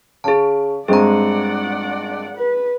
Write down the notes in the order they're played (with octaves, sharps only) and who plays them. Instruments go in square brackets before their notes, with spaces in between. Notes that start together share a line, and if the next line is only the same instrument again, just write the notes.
[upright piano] C#3 [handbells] G#4 A5
[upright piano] G2 G#3 C4 [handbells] G#4 A#5 [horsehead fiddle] D5 F#5
[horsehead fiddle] B4